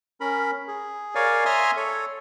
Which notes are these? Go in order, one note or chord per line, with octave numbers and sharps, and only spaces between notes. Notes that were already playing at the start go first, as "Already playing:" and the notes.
C#4 A#4 B5
G#4
A#4 C#5 D5 F5 G#5
E5 G#5 A#5 C6 D#6 F6
A4 C#5